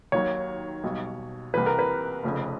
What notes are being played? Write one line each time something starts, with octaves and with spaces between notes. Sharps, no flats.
D#2 D#3 F#3 C#5
B1 B2 G3
C2 C3 E3 B4
A#4
B4
F1 F2 C#3